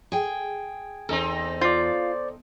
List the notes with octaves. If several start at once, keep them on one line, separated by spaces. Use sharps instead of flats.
G#4 G5
E2 C4 D#4 A4
F4 C5 D5